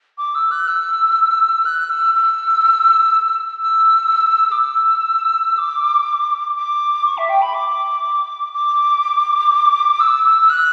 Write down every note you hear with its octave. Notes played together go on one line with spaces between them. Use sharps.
D6
E6
F#6
E6
F#6
E6
E6
E6
D6
E6
D6
D6
C#6
E5
G5
B5
D6
D6
E6
E6
E6
F#6